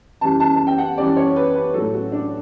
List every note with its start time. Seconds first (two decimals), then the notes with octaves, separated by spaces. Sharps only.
0.21 F#2 E3 G3 A5
0.40 A5
0.55 A5
0.67 G5
0.78 F#5
0.98 F#2 E3 G3 D5
1.17 C#5
1.36 B4
1.55 B4
1.74 A2 F#3 A4
1.93 F#4
2.12 D4